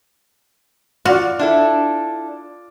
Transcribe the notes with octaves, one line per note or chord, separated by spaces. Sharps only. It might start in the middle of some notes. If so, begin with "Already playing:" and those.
F4 F#4 D5 F6
D4 E4 A4